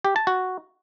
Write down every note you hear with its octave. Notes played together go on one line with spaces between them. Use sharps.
G4
A5
F#4